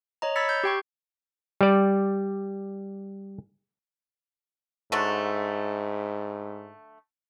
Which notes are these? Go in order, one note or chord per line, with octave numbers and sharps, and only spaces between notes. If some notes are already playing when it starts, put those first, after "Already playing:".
C#5 D#5 A#5
B5 E6 G#6 A6 B6 C#7
G6
G4 G5 C#6
G3 D5
G#2 D3 F#3 A3